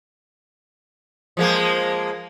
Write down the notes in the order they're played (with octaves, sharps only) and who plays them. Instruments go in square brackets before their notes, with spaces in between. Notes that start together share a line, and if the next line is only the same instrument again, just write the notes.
[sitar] F3 G#3 A#3